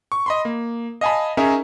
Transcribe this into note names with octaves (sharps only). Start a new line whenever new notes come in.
C#6
D#5 B5 C6
A#3
D#5 F5 G#5 A5 B5
C#4 D#4 G#4 A#4 C#5 E5